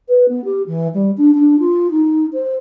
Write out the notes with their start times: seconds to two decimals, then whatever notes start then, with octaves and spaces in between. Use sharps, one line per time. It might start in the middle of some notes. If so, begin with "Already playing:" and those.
0.08 B4
0.29 B3
0.44 G4
0.67 E3
0.94 G3
1.17 D4
1.35 D4
1.59 F4
1.91 D#4
2.33 C5